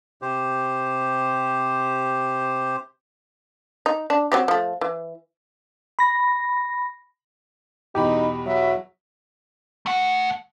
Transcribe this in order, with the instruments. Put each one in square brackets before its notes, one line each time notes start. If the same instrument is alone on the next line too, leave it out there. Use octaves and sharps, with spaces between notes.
[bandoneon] C3 G4 C5
[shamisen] D#4
D4
F#3 C4 G4
F3 A3
E3
[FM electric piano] B5 A#6
[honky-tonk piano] E2 B2 B5 [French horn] D#4 [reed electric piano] G4
[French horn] F#3 [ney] E5
[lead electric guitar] A3 F#5